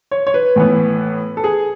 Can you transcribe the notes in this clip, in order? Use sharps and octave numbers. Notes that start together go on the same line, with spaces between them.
C#5
C#5
B4
A2 E3 B3
A4
G#4